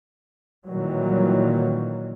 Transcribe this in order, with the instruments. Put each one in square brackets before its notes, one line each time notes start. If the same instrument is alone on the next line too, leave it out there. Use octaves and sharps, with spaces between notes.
[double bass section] A#2 D#3 E3 F#3 G3